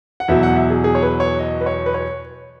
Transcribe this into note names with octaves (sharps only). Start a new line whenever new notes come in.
F#5
E2 B2 F#3 E5
F#5
E5
G#4
G#4
C#5
B4
C#5
D#5
B4
C#5
B4
C#5